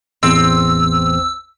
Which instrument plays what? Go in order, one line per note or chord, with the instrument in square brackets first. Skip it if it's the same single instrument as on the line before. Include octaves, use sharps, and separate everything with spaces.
[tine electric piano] A1 E2 [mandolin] C4 [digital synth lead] E6